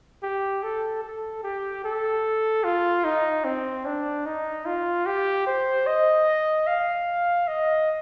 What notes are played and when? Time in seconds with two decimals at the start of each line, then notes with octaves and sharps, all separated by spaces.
0.23 G4
0.63 A4
1.03 A4
1.44 G4
1.84 A4
2.64 F4
3.04 D#4
3.44 C4
3.85 D4
4.26 D#4
4.66 F4
5.06 G4
5.47 C5
5.87 D#5
6.67 F5
7.48 D#5